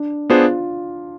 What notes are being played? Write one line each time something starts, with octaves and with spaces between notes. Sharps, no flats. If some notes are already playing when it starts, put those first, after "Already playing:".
Already playing: D4
B3 D4 F4 G#4 C5